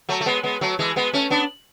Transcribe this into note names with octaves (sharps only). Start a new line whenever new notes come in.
F#3 A3
A3
G#3 B3
G#3 B3
F#3 A3
E3 G#3
G#3 B3
A3 C#4
B3 D4